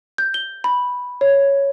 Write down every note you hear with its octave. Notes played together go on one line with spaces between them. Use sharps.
G6
G7
B5
C#5